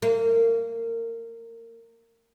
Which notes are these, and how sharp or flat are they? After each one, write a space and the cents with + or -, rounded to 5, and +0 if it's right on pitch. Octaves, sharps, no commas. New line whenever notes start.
A#3 -25